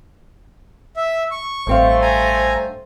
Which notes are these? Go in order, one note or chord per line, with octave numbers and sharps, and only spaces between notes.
E5
C#6
A1 G2 A3 C4 C5 F5
G#5 A#5